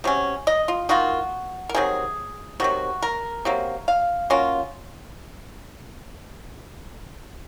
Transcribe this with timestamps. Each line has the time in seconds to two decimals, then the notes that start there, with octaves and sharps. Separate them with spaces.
0.04 C3 F#3 C#4
0.47 D#5
0.68 F4
0.89 D#3 A#3 F4 F#4
1.69 A#4
1.75 C3 D#3 F#3 G#4
2.60 C3 D#3 F#3 F#4
3.03 A#4
3.45 C3 F#3 A#3
3.88 F5
4.30 F#3 A#3 C#4 F4